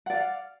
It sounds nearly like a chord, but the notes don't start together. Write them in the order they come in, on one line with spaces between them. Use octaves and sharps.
F#5 D5 F5